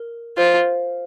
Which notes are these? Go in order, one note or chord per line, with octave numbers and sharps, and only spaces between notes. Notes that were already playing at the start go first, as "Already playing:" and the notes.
Already playing: A#4
F4 C5